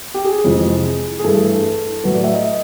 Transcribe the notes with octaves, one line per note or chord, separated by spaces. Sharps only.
G4
G#4
F2 C3 E3 G#3
G#4
G2 E3 A3 A4
A2 F#3 A3 B4
D5
E5
D#5